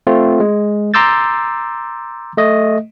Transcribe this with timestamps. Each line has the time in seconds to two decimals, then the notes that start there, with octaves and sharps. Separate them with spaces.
0.07 A3 C4 F4
0.40 G#3
0.94 A#5 C6 D6 E6 G6 A6
2.37 A3 D#5